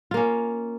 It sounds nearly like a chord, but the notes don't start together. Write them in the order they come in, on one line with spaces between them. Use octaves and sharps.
F4 A#3 C#4